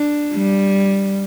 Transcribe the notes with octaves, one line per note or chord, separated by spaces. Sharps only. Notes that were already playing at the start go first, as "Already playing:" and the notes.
Already playing: D4
G3